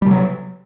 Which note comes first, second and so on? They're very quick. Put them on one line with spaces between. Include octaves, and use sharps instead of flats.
G3 C3 F#3